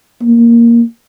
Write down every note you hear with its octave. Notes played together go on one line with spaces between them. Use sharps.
A#3